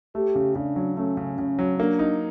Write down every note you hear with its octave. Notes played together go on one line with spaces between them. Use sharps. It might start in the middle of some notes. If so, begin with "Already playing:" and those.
A3 G4
C#3
C#3 D4
F#3
A3 C#4
C#3
C#3 C#4
F#3
A#3 D4
D#4